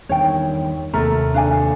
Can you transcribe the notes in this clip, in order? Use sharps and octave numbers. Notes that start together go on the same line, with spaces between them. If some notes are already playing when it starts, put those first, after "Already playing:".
E2 G2 D#3 C#5 G5
D#2 C3 A3 A#3 A#4
D4 F5 G#5